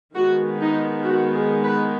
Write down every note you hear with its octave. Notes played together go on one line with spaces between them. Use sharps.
D#3 G#3 B3 F#4
D#4
F#4
G#4
B4